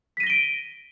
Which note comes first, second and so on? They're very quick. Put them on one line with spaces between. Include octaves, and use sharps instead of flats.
B6 D#7 A#6 G7 D7